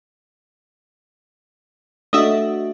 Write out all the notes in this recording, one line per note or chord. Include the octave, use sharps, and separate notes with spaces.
A3 D4 F#4 D#5 E5